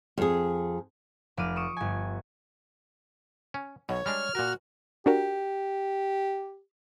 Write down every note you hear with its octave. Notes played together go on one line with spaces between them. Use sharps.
F2 G#4
F1 D5 F6 D#7
C#6 D#6 D7 E7
G1 G#5
C#4
B1 B2 C#5
G3 G#3 D4 F6
A#2 F#4 A#4
D4 F#4 G4 A#4